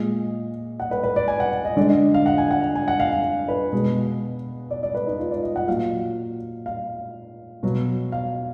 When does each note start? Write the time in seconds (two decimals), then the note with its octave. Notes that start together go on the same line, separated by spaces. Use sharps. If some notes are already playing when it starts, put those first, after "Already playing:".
Already playing: A#2 G#3 D#5
0.80 F#5
0.91 B4
1.03 B4
1.16 D5
1.28 G#5
1.40 F#5
1.65 D#5
1.77 D3 G#3 D5
1.89 D#5
2.14 F5
2.26 F#5
2.38 G#5
2.51 F#5
2.75 G#5
2.88 F#5
3.00 F5
3.12 F5
3.48 B4
3.72 B2 G#3
4.71 D5
4.83 D5
4.95 B4
5.07 D#4
5.19 F4
5.31 D5
5.43 D#5
5.56 F#5
5.68 A#2 F#3 F5
6.66 F5
7.63 B2 F#3
8.12 F5